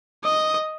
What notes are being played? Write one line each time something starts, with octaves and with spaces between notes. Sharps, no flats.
D#5